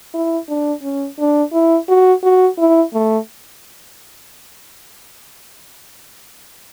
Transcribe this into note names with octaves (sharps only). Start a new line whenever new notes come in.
E4
D4
C#4
D4
E4
F#4
F#4
E4
A3